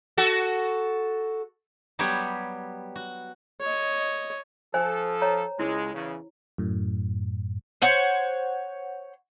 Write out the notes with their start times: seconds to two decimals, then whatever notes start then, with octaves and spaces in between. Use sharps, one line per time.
0.18 F#4 A4
1.99 F#3 G3 B3 G4 C#5
2.96 F#4
3.61 C#5 D#5
4.74 F3 A4 C5 G#5
5.21 C#5 A#5
5.59 C#2 G#3 E4
5.94 E2 C#3
6.58 F#2 A2
7.82 C5 C#5 F#5